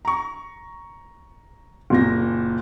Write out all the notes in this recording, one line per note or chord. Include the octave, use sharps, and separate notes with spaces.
A#5 C#6
F#1 A#2 A#6